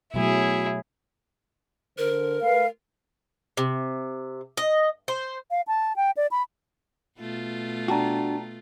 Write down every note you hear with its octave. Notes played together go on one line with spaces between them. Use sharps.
B2 F#3 A3 E4 G#4
D3 A#4 C5
A3 B4 F5
C3
D#5
C5
F5
A5
G5
D5
B5
B2 A3 F4
D4 F#4 G5 A5 A#5